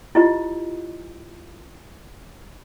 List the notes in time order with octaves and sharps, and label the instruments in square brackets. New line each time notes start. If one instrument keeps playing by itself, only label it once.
[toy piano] E4 F4 G4 D#5